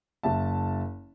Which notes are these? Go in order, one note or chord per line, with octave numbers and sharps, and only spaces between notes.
F#1 E5 A5